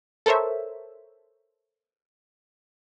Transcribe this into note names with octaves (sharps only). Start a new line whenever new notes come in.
A4 A#4 C5 C#5 E5